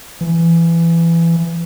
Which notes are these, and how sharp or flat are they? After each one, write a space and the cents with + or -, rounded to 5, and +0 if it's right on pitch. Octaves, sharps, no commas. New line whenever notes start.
E3 +20